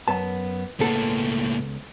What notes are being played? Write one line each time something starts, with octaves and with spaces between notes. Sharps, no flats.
F#2 B3 A5
C#2 A2 A#3 B3 A4